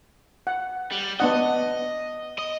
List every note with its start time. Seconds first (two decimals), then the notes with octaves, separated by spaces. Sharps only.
0.47 F#5
0.91 G3
1.20 B3 D4 D#5 F#5
2.39 D#5